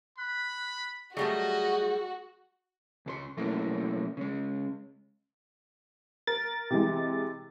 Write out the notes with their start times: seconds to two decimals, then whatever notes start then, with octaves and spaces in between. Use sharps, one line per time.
0.18 B5 F#6
1.17 F#3 G3 A3 F#4 G#4 D#5
3.06 C#2 A4 C6
3.37 B1 F#3 A3 A#3 C#4 E4
4.17 C#3 G#3
6.27 A#4 A6
6.71 C3 E3 G#3